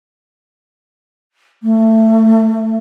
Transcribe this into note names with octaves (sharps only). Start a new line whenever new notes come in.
A3